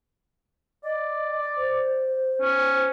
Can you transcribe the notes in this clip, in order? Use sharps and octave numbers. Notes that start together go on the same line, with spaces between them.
D5 D#5
C5
C#4